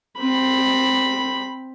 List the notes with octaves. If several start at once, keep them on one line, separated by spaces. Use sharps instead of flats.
C4 B5